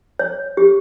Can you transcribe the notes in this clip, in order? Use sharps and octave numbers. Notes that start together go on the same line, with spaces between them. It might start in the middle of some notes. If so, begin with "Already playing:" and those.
C#5
G4